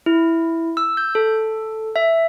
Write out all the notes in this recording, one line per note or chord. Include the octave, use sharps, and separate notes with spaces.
E4
E6
G6
A4
E5